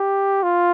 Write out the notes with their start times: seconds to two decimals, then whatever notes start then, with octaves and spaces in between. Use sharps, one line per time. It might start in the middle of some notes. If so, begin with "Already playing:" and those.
Already playing: G4
0.43 F4